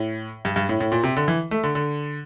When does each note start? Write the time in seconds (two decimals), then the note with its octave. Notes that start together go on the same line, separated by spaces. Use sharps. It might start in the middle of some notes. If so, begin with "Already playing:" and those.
Already playing: A2
0.45 G2
0.56 G2
0.69 A2
0.80 A2
0.92 A#2
1.03 C3
1.17 D3
1.28 E3
1.51 A3
1.63 D3
1.75 D3